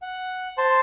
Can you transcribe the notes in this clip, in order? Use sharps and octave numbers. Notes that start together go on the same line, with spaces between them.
F#5
C5 A5 C6